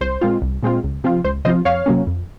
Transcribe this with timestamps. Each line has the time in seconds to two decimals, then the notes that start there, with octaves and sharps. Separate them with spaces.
0.01 C2 C5
0.21 A#2 G#3 C4 F4
0.42 C2
0.63 A#2 G#3 C4 F4
0.84 C#2
1.04 C3 F3 C4 F4
1.24 C#2 C5
1.45 C3 F3 C4 F4 C5 D#5
1.65 F2 C#5 F5
1.86 C3 F#3 A#3 C#4
2.07 F2